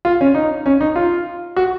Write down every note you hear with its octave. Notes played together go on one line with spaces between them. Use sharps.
F4
C#4
D#4
C#4
D#4
F4
F#4